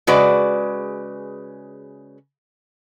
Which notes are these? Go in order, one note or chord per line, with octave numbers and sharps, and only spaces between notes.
C#3 G#3 F#4 B4 D5